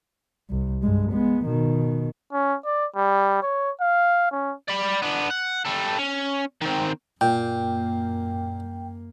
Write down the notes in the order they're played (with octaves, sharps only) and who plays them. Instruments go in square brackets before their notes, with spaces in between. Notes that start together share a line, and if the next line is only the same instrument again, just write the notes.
[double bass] C2
G2 G#3
G#3 B3
B2 D#3
[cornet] C#4
D5
G3
C#5
F5
C#4
[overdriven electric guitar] D5 B5
B3 D4
F#5
G3 A4
C#4
D#3 C4
[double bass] F#2 A#3 [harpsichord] A#2 [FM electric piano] G5